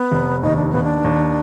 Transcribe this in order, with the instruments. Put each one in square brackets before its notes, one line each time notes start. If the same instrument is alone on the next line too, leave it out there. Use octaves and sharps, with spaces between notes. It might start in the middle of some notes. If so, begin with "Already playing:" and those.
Already playing: [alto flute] B3
[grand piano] F1
[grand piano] D#2 [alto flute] D#4
[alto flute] D4
[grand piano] D#2 [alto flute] B3
[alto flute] D4
[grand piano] D#2